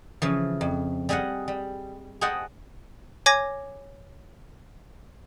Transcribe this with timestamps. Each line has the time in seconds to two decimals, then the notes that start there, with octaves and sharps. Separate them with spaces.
0.22 C#3 E3 F3
0.61 F2
1.09 G3 G#4 D#5 F5 F#5
1.48 G3
2.21 G#4 C5 D#5 F#5 G5 A5
3.26 C#5 G#5 D6 G#6 A#6